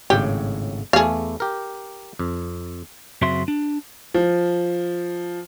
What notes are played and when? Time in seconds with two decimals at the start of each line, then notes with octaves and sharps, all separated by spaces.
0.10 G#1 A2 C#3 G4
0.93 E2 A3 G#4 F5
1.40 G4 A#4
2.19 F2
3.22 F#2 C#3 C4 F#4 E5 C6
3.48 D4
4.14 F3